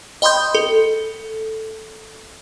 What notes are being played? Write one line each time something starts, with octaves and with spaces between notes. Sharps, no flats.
D#5 G5 B5 C6 D#6 G6
A4